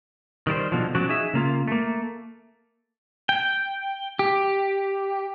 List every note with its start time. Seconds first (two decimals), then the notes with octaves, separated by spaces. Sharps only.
0.47 D#3 G3 E4 C5
0.72 B2 D3 D#3 F3
0.95 F3 F#3 C#4 D4 F#4
1.09 D#4 G#4 E5
1.34 C#3 A#3 F4
1.68 A3 A#3
3.29 G5
4.19 G4